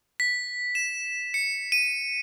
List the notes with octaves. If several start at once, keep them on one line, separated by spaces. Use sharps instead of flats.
B6
E7
C#7
D#7